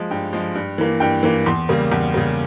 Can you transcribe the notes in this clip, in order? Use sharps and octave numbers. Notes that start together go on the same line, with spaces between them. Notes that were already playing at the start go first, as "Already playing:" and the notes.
Already playing: F3 G#3
G2 G5
F3 G#3
G2
E3 A#3
G2 G5
E3 A#3
E2 C6
C#3 G3 A#3
E2
C#3 G3 A#3